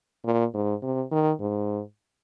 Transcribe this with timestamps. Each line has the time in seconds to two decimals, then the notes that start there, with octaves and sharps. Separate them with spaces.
0.25 A#2
0.54 G#2
0.83 C3
1.12 D#3
1.41 G#2